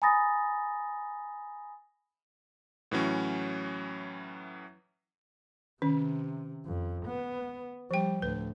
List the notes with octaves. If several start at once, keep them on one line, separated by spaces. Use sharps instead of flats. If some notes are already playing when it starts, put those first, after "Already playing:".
G#5 A#5 B5 D#6 A6 A#6
A2 E3 F#3 C#4
C3 D#3 C#4
F2
B3
F3 G3 G5
D2 A2 B4